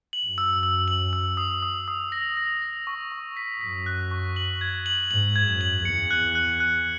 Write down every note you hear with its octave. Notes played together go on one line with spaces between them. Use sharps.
F#7
F#2
E6
E6
F#7
E6
D#6
D#6
D#6
A#6
A#6
A#6
C#6
C#6
B6
F#2 B6
F#6
C#6
F#7
G#6
F#7
G#2 F#7
G#6
F#2
F#7
E2 C#7
F#6
F#6
F#6